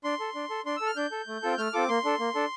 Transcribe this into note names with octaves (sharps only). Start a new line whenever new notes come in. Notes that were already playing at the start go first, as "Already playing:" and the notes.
D4 C6
A4
D4
A4
D4 C6
A4 E6
F6
D4 G6
A4
A3
C4 F4 A4
A3 F6
C4 F4 A4 D6
A#3 C6
D4 A4
A#3
D4 A4